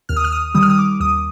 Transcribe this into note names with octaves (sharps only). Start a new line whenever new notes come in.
D#2 F6
D#6
F6
D#6
D#3 G3 D#6
F6
D#6
D6
D#2 D#6